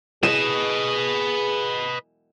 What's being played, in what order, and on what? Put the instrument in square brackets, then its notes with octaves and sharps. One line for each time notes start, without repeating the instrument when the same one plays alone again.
[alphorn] G#4 [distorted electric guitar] B4 D#5 [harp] E7